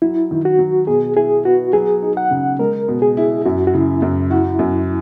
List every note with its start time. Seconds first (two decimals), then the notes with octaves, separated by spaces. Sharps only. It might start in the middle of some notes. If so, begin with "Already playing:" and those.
0.02 F#3 E4
0.31 D#3
0.45 F#4
0.59 F#3
0.87 B2 G#4
1.16 E4 G#4
1.45 B3 F#4
1.73 F#3 G#4
2.02 D#4
2.17 F#5
2.31 C#3
2.59 G#3 A#4
2.88 B2
3.02 G#4
3.17 E4
3.46 F#2 F#4
3.67 F#4
3.74 C#3 E4
4.02 F#2
4.31 E4 F#4
4.59 F#2